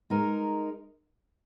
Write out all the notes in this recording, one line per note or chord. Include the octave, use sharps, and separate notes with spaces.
G#3 D#4 A#4